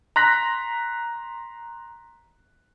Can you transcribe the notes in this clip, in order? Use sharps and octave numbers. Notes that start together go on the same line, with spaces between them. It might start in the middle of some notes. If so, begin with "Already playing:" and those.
A#5 C6 F#6 A#6 B6